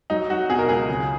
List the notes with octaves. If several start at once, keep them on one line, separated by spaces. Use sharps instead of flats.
F#3 D#4
F#3 F#4
B2 G#4
A#4
C#2 G#4
C#3